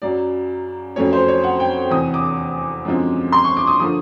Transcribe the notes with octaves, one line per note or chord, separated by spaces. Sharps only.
F#2 C#3 F#3 D5
F2 C#3 F#3 A3 C#4 C#5
C5
C#5
F#5
G5
E2 C3 E3 D#6
D6
F#2 D3 F3 G#3 C4
C6
C#6
D6
D#6
D3 F3 A#3 D#6